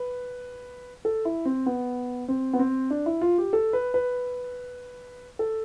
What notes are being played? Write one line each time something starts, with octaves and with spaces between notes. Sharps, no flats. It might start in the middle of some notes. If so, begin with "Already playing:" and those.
Already playing: B4
A4
E4
C4
B3
C4
B3
C4
D4
E4
F4
G4
A4
B4
B4
A4